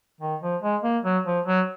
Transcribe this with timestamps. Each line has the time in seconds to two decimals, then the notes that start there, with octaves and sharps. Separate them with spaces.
0.21 D#3
0.42 F3
0.62 G#3
0.84 A#3
1.04 F#3
1.25 F3
1.46 F#3